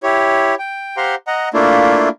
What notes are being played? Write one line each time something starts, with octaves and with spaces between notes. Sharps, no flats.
E4 G4 C#5
G5
G4 C5 F5 F#5 A#5 C6
D#5 F#5 A#5
A3 A#3 D4 E4 F4